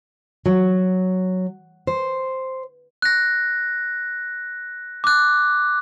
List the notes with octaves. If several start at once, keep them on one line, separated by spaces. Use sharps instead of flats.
F#3
C5
F#6 A#6
D6 F#6